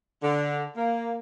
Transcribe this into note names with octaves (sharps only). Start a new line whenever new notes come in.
D3
A#3